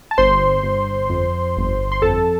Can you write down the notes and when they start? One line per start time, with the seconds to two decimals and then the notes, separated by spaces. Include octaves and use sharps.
0.11 A5
0.18 G1 C5 C6
0.63 G1
1.10 F2
1.57 G1
1.92 C6
2.02 F2 A4 A5